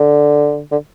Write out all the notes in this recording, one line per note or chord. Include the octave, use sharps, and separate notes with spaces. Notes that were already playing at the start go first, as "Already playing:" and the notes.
Already playing: D3
D3